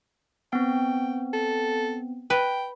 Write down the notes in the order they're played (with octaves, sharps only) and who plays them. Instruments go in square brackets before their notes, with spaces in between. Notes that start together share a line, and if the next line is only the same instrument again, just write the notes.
[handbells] B3 C4 [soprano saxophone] G5
[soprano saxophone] A4
[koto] B4 [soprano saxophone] G5